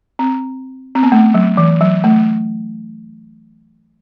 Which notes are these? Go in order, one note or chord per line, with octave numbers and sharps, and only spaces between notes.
C4
C4
B3
A3
F#3
E3
F#3
A3